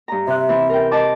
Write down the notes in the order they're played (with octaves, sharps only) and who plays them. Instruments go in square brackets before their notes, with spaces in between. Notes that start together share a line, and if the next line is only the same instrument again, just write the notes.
[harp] G2 A#5
[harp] C3 F#6 [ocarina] E5
[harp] E3 C4
A#4 G5
D#5 A5 D6